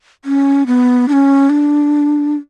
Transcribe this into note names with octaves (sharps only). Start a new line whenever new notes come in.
C#4
B3
D4
C#4
D4